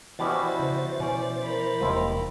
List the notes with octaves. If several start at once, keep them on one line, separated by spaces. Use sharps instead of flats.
B2 E3 G3 C#4 E4 F#4 C5 A6
C#3
B2 C#4 D5
A#4 B5
E1 D#2 C3 G3 E4 F4